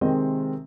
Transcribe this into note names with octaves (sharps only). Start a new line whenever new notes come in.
C3 D#3 G#3 C4 D#5